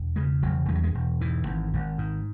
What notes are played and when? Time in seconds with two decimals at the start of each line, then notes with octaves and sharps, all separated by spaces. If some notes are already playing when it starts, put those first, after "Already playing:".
Already playing: E1
0.16 C#3 G#3
0.42 E1 F#3
0.69 E2 G#3
0.75 F#3
0.84 G#3
0.95 E1
1.21 G#2 E3
1.47 G#1
1.73 G#1
1.98 G#2